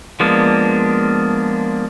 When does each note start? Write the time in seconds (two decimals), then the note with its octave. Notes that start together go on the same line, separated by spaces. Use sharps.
0.20 F3 G#3 A#3 B3 D4